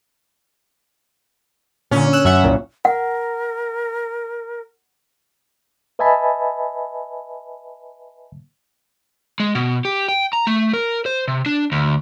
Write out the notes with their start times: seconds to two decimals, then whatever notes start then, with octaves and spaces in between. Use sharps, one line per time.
1.91 A#2 D3 C#4
2.13 E6 F#6
2.25 F#2 E5 F#5
2.44 C2 A#2
2.85 A#4 F#5
5.99 B4 D#5 E5 G#5 A5 B5
9.40 G#3
9.55 B2
9.85 G4
10.08 G5
10.33 A#5
10.47 A3
10.73 A#4
11.06 C5
11.28 C3
11.46 D4
11.72 D2